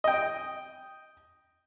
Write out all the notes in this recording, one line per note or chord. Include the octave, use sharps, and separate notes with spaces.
D#5 G5